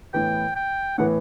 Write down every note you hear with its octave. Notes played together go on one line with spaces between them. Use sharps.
A2 E3 B3 G5
G5
A2 E3 B3 F#5